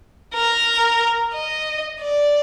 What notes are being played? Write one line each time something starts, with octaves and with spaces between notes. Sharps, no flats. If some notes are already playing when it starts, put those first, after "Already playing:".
A#4
D#5
D5